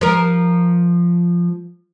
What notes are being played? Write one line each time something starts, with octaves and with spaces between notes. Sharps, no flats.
F3 A#4